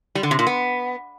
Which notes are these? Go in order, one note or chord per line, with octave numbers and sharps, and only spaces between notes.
G3
D3
C3
A#2
B3